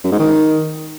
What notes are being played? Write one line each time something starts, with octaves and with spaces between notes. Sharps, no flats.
F#2
G#2
D#3